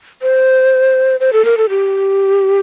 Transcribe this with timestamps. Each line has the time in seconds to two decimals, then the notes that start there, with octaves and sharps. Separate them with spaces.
0.22 C5
1.20 C5
1.33 A4
1.45 A#4
1.57 A4
1.70 G4